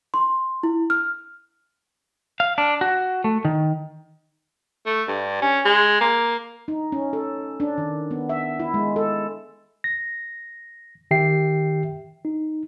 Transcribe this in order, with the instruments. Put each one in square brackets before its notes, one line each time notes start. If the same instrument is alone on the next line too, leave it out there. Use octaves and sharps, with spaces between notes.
[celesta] C6
E4
F6
[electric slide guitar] F5
D4
F#4
A3
D#3
[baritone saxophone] A3
G2
C#4
G#3
A#3
[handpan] D#4
C#4
A4
D4
D#3
B3
E5
E4
G#3
A4
[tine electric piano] A#6
D#3 G4 E5 G5 C7
D#4